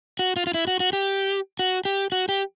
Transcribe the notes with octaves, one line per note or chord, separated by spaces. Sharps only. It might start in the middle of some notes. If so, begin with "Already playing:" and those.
F#4
F4
F4
E4
F#4
F#4
G4
F#4
G4
F#4
G4